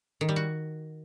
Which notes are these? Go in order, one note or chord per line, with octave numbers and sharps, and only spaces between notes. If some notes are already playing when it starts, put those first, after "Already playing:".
D#3
G3
F#4